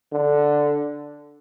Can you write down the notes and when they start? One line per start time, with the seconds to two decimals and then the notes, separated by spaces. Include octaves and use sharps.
0.12 D3